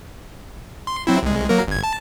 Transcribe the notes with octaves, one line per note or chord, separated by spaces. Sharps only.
C6
F#3 C4 E4
C2 G#3
F#3 A#3 A#4
G1 G#6
A5